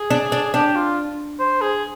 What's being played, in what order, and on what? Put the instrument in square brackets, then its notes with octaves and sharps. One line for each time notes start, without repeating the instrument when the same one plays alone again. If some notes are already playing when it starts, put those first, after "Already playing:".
Already playing: [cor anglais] G#4
[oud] D4
D4
[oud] D4 [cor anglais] G4
[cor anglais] F4
C5
G#4